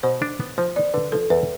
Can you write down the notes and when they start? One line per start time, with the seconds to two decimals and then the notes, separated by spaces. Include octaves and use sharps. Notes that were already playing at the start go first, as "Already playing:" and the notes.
0.03 B2 C5
0.22 D4
0.40 B3
0.58 F3 C5
0.76 B3 D5
0.94 D3 B4
1.12 F3 A4
1.30 E2 B4